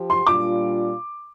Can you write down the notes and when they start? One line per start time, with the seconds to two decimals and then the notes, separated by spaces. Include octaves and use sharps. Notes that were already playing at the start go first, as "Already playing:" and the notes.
Already playing: F3 G4
0.10 C6
0.26 A#2 G3 D4 F4 D6